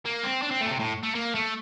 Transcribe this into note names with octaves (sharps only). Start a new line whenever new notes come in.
A#3
C4
D4
C4
A3
A#2
C3
A2
A3
A#3
A3